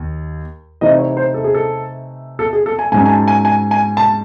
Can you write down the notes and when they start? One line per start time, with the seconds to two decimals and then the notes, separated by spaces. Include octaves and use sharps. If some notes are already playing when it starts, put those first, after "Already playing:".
Already playing: D#2
0.81 C3 E3 A3 C4 D#4 D#5
0.99 C#5
1.17 C5
1.34 A4
1.44 G#4
1.55 A4
2.39 A4
2.53 G#4
2.66 A4
2.79 G#5
2.92 G#2 F#3 C#4 G#5
3.05 G#5
3.10 A5
3.28 G#5
3.45 G#5
3.71 G#5
3.97 A5